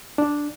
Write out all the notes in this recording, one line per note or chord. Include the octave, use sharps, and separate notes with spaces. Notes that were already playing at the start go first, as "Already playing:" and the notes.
D4